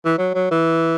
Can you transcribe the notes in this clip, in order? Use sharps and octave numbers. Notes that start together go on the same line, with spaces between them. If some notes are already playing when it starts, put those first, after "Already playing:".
E3
F#3
F#3
E3